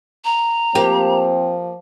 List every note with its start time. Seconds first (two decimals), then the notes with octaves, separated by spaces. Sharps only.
0.25 A#5
0.75 F3 A#3 C4 G4